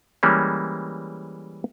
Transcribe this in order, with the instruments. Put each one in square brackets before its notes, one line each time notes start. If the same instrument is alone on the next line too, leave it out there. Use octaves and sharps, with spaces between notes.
[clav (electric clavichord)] E3 G3 G#3 A#3 C#4